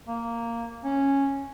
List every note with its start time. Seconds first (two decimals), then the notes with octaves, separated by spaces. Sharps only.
0.08 A#3
0.84 C#4